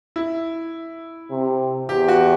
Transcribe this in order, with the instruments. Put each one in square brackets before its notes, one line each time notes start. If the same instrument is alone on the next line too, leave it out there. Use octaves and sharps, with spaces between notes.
[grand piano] E4
[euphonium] C3
[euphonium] E2 [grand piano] G4
[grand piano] F#4